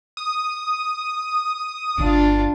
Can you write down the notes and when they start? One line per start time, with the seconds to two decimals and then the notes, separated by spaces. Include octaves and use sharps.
0.17 D#6
1.98 G1 D3 D4 F4